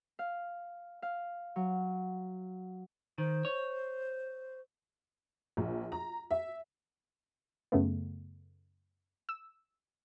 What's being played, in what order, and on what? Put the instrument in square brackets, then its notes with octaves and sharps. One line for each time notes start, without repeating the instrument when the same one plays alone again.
[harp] F5
F5
F#3
[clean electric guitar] D#3 [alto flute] C5
[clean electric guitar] C#5
[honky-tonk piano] A#1
A#5
E5
[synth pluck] F#2 C#3 A3 B3
E6